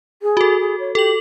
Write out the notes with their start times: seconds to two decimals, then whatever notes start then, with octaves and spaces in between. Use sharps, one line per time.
0.22 G#4
0.37 F#4 A4
0.60 G#4
0.79 C#5
0.95 G4 A4 F#7